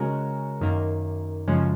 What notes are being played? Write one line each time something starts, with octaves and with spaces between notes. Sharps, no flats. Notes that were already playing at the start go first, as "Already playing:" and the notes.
Already playing: C#3 G#3 C#4 F#4 A#4
F#2 D#3 A#3
F#2 C#3 F3 G#3 C#4